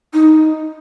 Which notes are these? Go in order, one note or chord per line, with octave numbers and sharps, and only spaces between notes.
D#4